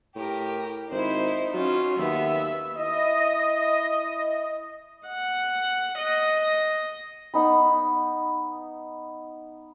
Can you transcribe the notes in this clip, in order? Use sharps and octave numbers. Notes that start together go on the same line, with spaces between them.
A2 G4 A#4
G#1 D#4 E4 C5
F#3 C#4 F4
D#2 B3 E5
E4 D#5
F#5
D#5
B3 D#4 B5